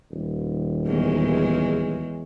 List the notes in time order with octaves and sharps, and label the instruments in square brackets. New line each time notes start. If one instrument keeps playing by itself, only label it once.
[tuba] D#1
[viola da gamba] E2 F#3 G#3